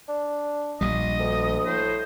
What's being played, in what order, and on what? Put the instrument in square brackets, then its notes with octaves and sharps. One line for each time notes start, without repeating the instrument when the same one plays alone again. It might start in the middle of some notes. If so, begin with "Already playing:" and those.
[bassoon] D4
[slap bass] A#1 G3 [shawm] D#5
[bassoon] D2
[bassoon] A2 [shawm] C5